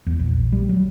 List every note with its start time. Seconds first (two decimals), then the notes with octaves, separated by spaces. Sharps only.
0.06 E2
0.19 A#1
0.52 G3
0.69 F#3